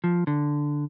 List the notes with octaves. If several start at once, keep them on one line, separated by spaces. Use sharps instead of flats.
F3
D3